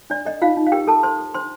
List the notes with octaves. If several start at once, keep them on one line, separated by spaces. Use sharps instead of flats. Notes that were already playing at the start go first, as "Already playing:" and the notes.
D4 D5
A4 D#5
D#4 F4 F5
D#4
F5
G4 A#4 G5
A4 A#4 A5
C5 C6
A4
D4 C5 C6